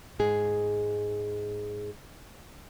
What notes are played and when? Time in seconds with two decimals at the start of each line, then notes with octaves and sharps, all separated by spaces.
0.19 G#2 G#3 G#4